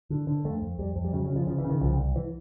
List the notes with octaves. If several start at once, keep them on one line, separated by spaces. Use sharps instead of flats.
D3
D3
F2 A3
F2
F2 G3
F2
G3
C#3 F#3
F#3
C#3
F3
C#3 F3
E3
C#3
D#3
C2 F3
C2
E3